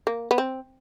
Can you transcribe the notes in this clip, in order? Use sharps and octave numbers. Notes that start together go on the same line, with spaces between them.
A#3
B3
C4